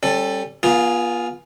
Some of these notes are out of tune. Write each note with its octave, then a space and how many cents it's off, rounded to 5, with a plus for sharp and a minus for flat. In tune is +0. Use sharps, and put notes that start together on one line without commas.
G3 +0 C#4 -30 A4 +10
B3 -40 F4 +0 G#4 +0